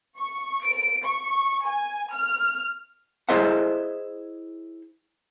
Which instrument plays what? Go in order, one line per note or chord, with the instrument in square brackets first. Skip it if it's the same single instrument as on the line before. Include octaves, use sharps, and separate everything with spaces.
[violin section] C#6
D7
C#6
G#5
F6
[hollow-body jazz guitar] E4 G#4 C5 D#5 E5 F#5